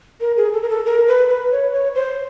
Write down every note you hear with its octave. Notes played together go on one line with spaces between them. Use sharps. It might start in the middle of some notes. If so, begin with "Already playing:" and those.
A#4
G#4
A4
A#4
A4
A#4
B4
B4
C#5
C#5
C5